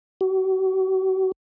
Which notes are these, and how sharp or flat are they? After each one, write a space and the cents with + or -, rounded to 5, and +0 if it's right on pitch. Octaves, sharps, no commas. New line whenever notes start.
F#4 +40